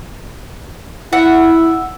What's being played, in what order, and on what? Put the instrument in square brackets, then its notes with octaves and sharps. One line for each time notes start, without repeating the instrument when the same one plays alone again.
[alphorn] E4 [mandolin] E5 F#5